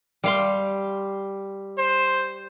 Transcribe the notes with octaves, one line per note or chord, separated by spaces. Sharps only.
G3 F5 C6
C5